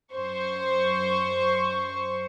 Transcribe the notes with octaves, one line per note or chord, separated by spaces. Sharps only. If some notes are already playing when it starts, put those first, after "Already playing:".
F#2 C5 C#6